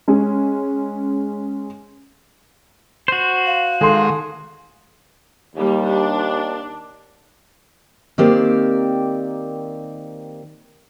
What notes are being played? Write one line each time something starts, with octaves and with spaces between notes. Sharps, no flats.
G#3 C#4
F#4 C5
F5
D#3 G#3 A4 C6
D#2 G3 A#3
D4
D#3 A#3 C4 G4 D5